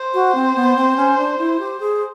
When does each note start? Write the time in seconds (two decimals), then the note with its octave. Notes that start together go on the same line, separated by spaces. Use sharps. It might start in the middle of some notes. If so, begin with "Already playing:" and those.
Already playing: C5
0.14 F#4
0.35 C4
0.55 B3
0.76 C4
0.97 C#4
1.18 D4
1.38 E4
1.59 G4
1.80 G#4